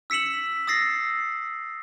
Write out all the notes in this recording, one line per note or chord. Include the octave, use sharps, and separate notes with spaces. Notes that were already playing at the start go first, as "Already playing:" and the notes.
E6 B6 C#7 E7 F#7
D#6 E6 A6 A#6 C7